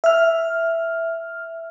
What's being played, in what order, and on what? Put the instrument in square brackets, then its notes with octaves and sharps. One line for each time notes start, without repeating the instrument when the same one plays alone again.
[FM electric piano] E5 F6